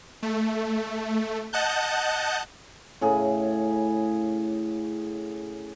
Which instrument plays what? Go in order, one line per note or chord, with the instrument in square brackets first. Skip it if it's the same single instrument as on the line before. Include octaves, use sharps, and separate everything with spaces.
[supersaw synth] A3
D#5 F#5 A5 F#6 G6
[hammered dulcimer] A2 C#3 G#4